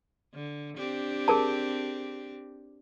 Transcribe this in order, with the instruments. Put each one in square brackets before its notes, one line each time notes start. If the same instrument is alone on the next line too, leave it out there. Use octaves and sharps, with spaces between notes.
[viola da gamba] D3
C4 D4 G4
[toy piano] G#4 A#4 A5